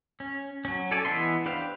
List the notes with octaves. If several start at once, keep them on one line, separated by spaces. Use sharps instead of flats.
C#4
F#3 C#4
A4 C#5 D5 G#5 A5
E3 G#3 B3 E5 C6
D4 G4 B4 C5 F5